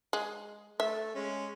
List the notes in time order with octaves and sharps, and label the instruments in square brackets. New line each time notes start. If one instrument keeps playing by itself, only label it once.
[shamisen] G#3
[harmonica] A3 [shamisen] E5
[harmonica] G#3 C#4